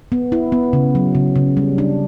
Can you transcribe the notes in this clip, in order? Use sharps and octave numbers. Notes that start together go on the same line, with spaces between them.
B3
E4
B3
C#3
F#3
C#3
C#3
G3
D4